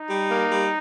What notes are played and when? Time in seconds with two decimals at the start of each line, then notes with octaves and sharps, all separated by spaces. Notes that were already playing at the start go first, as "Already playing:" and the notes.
Already playing: D#4
0.09 G3
0.30 A#3
0.51 G3